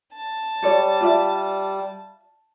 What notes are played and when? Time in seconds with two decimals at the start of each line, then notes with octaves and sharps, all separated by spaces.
0.13 A5
0.62 G3 A4 C#5 D5
1.01 F4 D5 E5